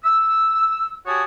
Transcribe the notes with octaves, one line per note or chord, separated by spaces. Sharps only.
E6
F#4 G4 C#5 G#5 A5 D#6